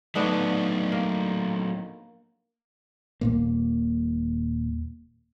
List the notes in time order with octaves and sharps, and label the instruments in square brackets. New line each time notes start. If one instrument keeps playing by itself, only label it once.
[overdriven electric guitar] F#3 A3 [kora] B3 D4 D#4
[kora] A#3
[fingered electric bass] D#1 A#2 A#3